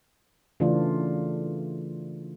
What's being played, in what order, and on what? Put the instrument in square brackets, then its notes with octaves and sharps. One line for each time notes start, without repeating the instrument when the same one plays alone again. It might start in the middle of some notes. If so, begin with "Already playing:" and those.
[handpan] C#3 E3 A3 D4 F4